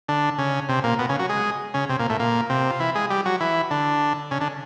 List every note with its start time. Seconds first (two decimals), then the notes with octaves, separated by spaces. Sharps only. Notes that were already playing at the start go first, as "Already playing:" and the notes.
0.09 D3 D4
0.38 C#3 C#4
0.69 C3 C4
0.84 A#2 A#3
0.99 B2 B3
1.09 C#3 C#4
1.19 F#3 F#4
1.29 G#3 G#4
1.74 C#3 C#4
1.89 C3 C4
1.99 A#2 A#3
2.10 A2 A3
2.20 A#2 A#3
2.50 C3 C4
2.70 F4
2.80 E3 E4
2.95 G#3 G#4
3.10 G3 G4
3.26 F#3 F#4
3.40 E3 E4
3.71 D3 D4
4.31 C#3 C#4
4.41 D3 D4